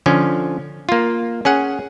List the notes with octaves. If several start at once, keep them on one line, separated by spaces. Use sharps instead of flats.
D3 F3 C#4
A#3 F4
C#4 G#4 F#5